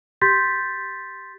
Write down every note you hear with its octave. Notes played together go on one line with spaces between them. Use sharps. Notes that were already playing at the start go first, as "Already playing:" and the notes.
G4 C6 G6 A6 B6